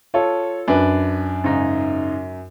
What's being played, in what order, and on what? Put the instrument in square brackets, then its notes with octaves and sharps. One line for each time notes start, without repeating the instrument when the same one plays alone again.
[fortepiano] F4 A4 [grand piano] C#5
[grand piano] F#2 [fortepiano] D4 B4
[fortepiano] G#2 C#3 D#4